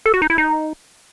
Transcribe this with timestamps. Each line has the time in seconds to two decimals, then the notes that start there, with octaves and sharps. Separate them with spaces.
0.06 A4
0.14 F#4
0.22 D#4
0.30 E4
0.38 D#4